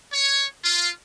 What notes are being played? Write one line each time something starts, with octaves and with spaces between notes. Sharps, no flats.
C#5
F4